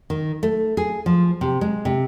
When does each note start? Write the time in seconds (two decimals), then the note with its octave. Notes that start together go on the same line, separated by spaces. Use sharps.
0.10 D#3
0.43 A3
0.77 G#4
1.06 F3
1.41 C3
1.61 G#3
1.85 C3